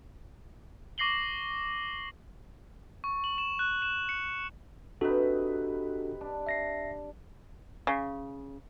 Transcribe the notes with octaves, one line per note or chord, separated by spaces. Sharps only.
C#6 D6 A#6 C7 F#7 G7
C#6
F#7
E7
F#6
E7
C#7
C3 D4 D#4 F#4 A4 B4
D4
E5 A#6 C7
C#3